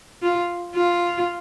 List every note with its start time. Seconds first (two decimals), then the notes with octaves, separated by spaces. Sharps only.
0.23 F4
0.75 F4